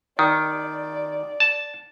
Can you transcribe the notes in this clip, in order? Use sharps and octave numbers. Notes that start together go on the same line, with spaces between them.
D#3 D5
A5